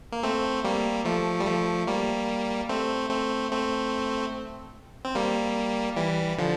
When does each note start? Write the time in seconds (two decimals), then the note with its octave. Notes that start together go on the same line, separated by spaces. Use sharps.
0.12 A#3
0.23 A3 C4
0.64 G3 A#3
1.05 F3 A3
1.40 G3
1.46 F3 A3
1.87 G3 A#3
2.69 A3 C4
3.10 A3 C4
3.51 A3 C4
5.05 C4
5.15 G3 A#3
5.97 E3 G3
6.38 D3 F3